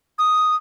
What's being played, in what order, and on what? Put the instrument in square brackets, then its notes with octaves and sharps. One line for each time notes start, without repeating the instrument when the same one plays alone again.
[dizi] D#6